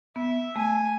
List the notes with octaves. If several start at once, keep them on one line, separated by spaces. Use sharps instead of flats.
B3 E5
A3 G#5